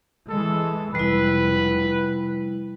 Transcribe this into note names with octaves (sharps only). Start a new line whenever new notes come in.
E3 G#3 A4
F1 G3 E4 B4